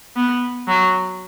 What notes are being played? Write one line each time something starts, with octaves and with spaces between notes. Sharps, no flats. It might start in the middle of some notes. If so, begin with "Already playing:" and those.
B3
F#3